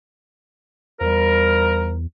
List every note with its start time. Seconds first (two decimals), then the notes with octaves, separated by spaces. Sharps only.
1.01 E2 F3 G3 A#4